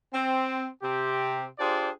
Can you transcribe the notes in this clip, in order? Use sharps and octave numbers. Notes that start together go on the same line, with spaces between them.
C4
C3 C4 G4
D4 F4 G4 G#4 C5 D5